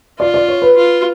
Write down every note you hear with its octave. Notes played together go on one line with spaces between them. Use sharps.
F4 D5
D5
C#5
B4
F4